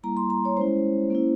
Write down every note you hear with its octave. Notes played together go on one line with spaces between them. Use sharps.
G3 A#3 E4 A#5
C6
A#5
C#5
G#3 C#4 E4 C5
A#3 C#4 E4